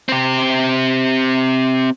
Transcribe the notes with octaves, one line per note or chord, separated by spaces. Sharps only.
C4 G4